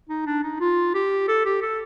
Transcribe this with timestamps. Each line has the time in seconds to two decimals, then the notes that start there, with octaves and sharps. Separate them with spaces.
0.09 D#4
0.26 D4
0.43 D#4
0.60 F4
0.94 G4
1.28 A4
1.45 G4
1.62 A4